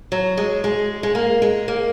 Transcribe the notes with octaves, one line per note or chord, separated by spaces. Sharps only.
F#3
G#3
G#3
G#3
A#3
G#3
A#3